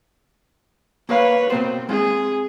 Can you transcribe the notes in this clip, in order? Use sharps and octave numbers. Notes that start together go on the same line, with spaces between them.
A#3 B4 C#5 F5
B2 A#3 C4 C5
G#3 C4 G#4